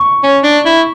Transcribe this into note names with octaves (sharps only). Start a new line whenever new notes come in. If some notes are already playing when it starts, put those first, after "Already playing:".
Already playing: C#6
C#4
D4
E4